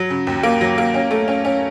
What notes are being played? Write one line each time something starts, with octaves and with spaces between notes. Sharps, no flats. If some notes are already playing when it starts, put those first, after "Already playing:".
Already playing: F#3
C#3
D#2
A#3
F#3
A#3
C#4
A3
C#4
C#4